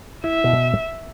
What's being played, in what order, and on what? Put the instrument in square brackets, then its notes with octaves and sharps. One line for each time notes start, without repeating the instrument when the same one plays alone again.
[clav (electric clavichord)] E4 [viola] E5
[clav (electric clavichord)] B2